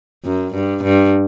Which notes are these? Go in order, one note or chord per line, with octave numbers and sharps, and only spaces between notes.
F#2
G2
G2